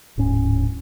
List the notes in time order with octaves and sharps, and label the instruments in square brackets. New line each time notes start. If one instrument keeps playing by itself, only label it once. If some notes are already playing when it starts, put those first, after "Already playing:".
[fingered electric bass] D1 G#2 C#4